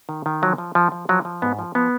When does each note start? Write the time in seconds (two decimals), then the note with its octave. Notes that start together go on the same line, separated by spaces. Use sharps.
0.09 D#3
0.26 D#3
0.42 F3 F#3
0.58 F3
0.75 F3
0.92 F3
1.09 F3 F#3
1.25 F3
1.42 G#2 B3
1.59 F3
1.75 F3 B3